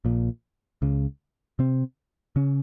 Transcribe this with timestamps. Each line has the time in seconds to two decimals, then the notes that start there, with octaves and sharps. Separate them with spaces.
0.05 A#1 A#2
0.82 C#2 C#3
1.59 C3 C4
2.36 C#3 C#4